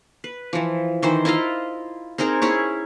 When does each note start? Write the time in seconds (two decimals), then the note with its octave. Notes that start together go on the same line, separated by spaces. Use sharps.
0.24 B4
0.53 E3 F3
1.02 D#3 E3 C5
1.25 E4 F4 D#5 F5
2.18 C4 D#4 G#4 A#4
2.42 C#4 E4 G#4 C#5